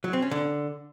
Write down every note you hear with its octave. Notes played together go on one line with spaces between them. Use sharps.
F#3
C4
C#4
D3